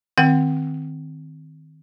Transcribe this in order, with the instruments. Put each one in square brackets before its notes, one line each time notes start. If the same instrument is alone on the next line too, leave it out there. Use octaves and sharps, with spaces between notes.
[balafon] D#3 C4 F#5 G5